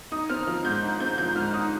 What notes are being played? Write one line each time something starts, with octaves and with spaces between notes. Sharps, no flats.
D#4 D#6
C4 F6
F3 F6
G#2 G6
D#4
C4 G6
F3 G6
G#2 F6
D#4 D#6